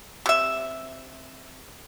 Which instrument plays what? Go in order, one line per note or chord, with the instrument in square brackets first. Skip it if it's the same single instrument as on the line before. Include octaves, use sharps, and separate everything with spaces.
[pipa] C3 E5